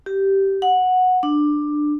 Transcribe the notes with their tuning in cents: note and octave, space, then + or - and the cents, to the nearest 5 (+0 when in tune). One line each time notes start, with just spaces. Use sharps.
G4 -10
F#5 -10
D4 +15